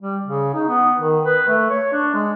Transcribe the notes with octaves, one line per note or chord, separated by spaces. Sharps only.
G3
C#3
D#4
B3
D#3
B4
A3
C#5
D4
G#3